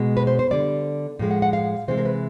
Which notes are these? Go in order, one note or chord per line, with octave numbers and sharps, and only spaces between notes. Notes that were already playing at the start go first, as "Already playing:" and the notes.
Already playing: B2 G#3
B4
C5
C5
D3 G3 D5
A2 F3 G#3
F#5
F#5
F5
C3 E3 G#3 C5
A#4
B4